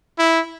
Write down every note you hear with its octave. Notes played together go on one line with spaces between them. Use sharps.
E4